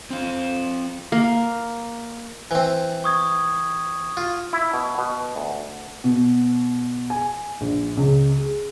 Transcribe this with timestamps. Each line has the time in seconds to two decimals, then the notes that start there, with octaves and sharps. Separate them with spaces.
0.10 C4 F5
1.12 A#3
2.51 E3 C4
3.04 C#6 D#6 G#6
4.17 F4
4.53 E4
4.73 B2
4.98 B2
5.36 D2
6.04 B2
7.10 G#5
7.61 A#1
7.97 C#2
8.37 G#4